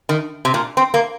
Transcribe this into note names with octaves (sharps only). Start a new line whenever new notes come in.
D#3
C3
A#2
C4
A#3